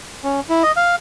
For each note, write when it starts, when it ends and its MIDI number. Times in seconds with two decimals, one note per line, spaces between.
0.24 0.40 61
0.49 0.63 64
0.63 0.72 75
0.77 0.96 77